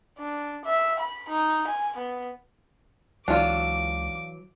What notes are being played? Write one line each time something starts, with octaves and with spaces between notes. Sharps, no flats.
D4
E5
B5
D#4
G#5
B3
C#2 E3 F#3 D4 F4 D6